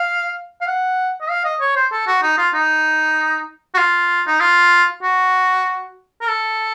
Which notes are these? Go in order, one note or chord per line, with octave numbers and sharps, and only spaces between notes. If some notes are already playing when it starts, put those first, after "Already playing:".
Already playing: F5
F5
F#5
D#5
F5
D#5
C#5
C5
A4
F#4
D#4
F4
D#4
F#4
F4
D#4
F4
F#4
A#4
A4